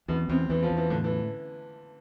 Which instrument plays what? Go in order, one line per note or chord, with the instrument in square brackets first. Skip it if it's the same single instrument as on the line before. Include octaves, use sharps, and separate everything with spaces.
[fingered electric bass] E2 [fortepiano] B2
[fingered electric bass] E2 [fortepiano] C3
[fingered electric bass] E2 [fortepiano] E3
[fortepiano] F3
[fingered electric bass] E2
[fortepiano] E3
[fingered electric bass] A2 [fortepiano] D3
[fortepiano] E3